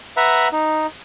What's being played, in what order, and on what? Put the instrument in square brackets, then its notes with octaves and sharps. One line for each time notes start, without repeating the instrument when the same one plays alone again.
[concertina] B4 E5 F#5 A#5
D#4